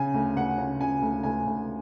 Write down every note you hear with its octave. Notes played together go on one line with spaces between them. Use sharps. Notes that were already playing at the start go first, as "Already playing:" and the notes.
Already playing: C#3 G#5
D2
D2 F#5
C#3
C#3 G#5
D2
D2 G#5
D2